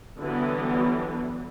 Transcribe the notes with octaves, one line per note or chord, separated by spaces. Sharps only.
D3 E3 F#3 G3 B3